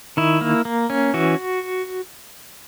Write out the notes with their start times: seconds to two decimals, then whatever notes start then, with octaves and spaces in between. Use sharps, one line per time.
0.17 D#3 E4
0.41 A#3
0.65 A#3
0.90 C#4
1.14 E3 F#4